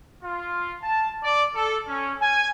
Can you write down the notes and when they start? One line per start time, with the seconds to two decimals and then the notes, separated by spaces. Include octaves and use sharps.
0.23 F4
0.82 A5
1.23 D5
1.55 A4
1.87 C#4
2.21 G#5